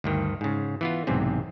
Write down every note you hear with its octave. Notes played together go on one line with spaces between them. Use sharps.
D2 G2 D#3
G#2 C#3
E3 B3 F4
B1 E2 G#2 C3 C4